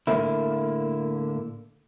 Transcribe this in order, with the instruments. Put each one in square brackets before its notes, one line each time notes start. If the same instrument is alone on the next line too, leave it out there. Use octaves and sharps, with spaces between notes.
[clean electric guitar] A2 D3 A#3 E4